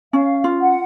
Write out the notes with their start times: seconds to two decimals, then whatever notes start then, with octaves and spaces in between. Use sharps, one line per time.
0.13 C#4 F5
0.44 F4
0.61 F#5